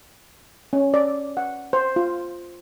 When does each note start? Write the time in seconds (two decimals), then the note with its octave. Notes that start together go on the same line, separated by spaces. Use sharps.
0.73 C#4
0.94 D5
1.37 F#5
1.73 C5
1.96 F4